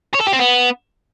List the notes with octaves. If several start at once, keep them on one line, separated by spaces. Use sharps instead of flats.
C#5
A4
G4
C4
B3